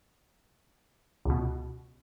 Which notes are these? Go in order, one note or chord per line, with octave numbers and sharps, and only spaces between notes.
C#2 B2